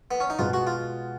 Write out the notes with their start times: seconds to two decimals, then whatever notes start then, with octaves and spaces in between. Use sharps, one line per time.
0.11 B3
0.20 C#4
0.30 D#4
0.39 B2 G#3 B3 F4
0.53 F#4
0.67 F4